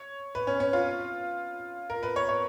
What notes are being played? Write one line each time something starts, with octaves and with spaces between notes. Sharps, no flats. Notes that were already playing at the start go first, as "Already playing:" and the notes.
Already playing: C#5
B4
C#4
C#4
F4
A#4
B4
C#5
C#5